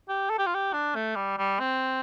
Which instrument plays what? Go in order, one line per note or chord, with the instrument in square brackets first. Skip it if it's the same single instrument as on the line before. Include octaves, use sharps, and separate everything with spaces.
[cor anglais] G4
A4
G4
F4
G4
D4
A3
G3
G3
C4